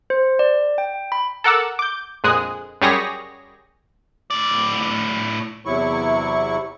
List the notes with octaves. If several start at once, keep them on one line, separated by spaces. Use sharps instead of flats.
C5
D5
G5
B5
A4 A#4 F#5 D6 E6
D6 G6
A#1 F2 G#3 G#4 D#6 F#6
F#2 G3 G4 G#4 C#5 A#6
A2 D5
E2 C3 F#3 E4 C#6